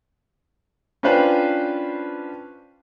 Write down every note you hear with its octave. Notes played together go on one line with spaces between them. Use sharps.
C#4 D4 F4 B4 C5 G5